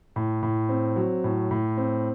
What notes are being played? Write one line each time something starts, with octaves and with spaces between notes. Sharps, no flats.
A2
A2
C4
F#3
A2
A2
C4